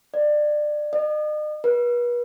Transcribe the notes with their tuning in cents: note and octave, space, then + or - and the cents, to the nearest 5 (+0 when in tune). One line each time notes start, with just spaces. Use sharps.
D5 +25
D#5 -40
B4 -40